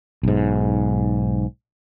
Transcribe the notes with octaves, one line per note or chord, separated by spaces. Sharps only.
B1 G#2